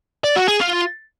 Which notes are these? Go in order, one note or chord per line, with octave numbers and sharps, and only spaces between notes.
D5
F#4
G#4
F4